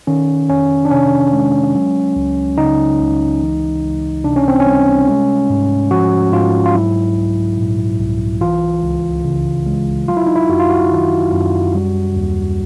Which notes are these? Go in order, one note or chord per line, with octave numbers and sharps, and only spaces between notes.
D#3 C#4
F2 C#4
D4
C3 C#4
G#3
F#3
C#2
C#3 D#4
C#2
E3
C#2
C3 D4
C#4
C4
C#4
G3
G#3
G#2
F3 F#4
G#2 F4
F4
F#3 E4
C2
A#2
C2
E3 F4
C#2
C#3
G#3
F#3 F4
E4
D#4
E4
F#2 F#4
F4
F#4
D#3
F#2
G3
D#2